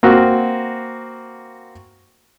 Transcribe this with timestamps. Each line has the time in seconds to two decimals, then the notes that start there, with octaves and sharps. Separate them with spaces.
0.03 A#3 C4 F#4